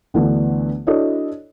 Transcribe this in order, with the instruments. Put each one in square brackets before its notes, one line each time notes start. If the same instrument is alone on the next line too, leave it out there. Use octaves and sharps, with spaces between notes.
[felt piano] D2 D3 E3 A3 B3
D4 E4 F#4 A4 C#5 D#5